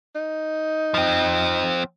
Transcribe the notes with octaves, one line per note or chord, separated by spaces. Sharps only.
D#4
F3 C4